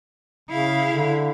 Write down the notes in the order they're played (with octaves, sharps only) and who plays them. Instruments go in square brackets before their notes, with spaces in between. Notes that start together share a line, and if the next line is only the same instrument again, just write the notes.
[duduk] C#3 [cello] E4 F5
[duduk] D3